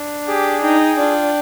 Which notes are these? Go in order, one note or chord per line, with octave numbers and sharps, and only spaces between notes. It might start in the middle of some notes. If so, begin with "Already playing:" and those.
Already playing: D4
G4 G#4
D#4 G5
D4 F4